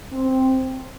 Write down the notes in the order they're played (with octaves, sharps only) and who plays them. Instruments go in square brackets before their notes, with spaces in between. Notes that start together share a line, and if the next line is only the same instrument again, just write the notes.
[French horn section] C4